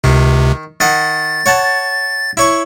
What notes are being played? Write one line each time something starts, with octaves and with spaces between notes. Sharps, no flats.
C#2 C3 D#3
D#3 D#5 F#5 A6
C#5 F#5 A5
E4 C#5 C#6